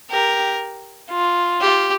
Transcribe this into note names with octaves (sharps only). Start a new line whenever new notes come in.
G4 A#4
F4
G4